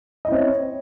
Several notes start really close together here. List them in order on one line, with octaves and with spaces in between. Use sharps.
D#5 E4 C4 C#5